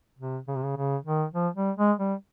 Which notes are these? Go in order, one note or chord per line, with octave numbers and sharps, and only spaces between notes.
C3
C#3
C3
C#3
C#3
D#3
F3
G3
G#3
G3